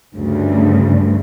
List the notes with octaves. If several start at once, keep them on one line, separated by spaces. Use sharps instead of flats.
D2 G2 C#3